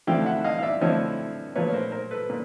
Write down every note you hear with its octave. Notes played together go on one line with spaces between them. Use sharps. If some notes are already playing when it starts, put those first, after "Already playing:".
D3 F3 A3 C4 E4 F5 G5
E5 F#5
D#5 F5
F5
D5 E5
D3 F3 A3 C4 E4 C#5 D#5
A#2 F3 A3 B4 C#5
C#5
A#4 C5
A#4 C5
A4 B4
A#2